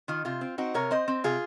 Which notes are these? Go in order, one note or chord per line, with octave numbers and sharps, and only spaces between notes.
D#3 F4
C3 F4
C4
C4 D#4 F#4
C3 A#4 C#5
C4 C5 D#5
C4
C3 F4 G#4